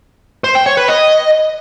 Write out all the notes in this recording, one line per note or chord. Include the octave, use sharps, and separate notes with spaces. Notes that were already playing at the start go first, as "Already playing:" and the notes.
C5
G5
C#5
B4
D#5